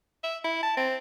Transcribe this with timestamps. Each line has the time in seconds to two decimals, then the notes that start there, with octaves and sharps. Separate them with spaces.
0.24 E5
0.44 E4
0.63 A5
0.77 C4